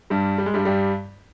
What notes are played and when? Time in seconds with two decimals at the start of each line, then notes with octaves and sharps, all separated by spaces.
0.10 G2 G3
0.38 G3
0.46 G#3
0.54 G2 G3
0.65 G2 G3